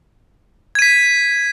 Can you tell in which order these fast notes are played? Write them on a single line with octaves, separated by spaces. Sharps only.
G#6 D#7 B6